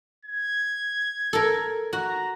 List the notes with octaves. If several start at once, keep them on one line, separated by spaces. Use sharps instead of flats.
G#6
A4 A#4
F#4 A#5